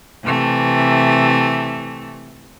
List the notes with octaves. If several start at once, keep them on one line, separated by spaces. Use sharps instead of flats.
C3 E3 A3